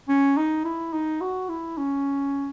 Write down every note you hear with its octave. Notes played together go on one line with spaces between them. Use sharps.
C#4
D#4
E4
D#4
F#4
E4
C#4